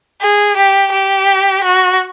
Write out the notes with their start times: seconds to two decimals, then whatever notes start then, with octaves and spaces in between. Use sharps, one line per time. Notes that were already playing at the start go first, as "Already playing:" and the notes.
0.21 G#4
0.56 G4
0.92 G4
1.64 F#4